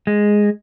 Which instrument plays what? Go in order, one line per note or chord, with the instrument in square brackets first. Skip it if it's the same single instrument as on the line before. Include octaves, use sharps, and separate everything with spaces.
[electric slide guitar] G#3